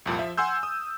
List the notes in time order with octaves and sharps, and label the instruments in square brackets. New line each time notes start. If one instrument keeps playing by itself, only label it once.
[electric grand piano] C2 F2 A#2
F3 E5
F#5 G#5 C6 E6 G6
D#6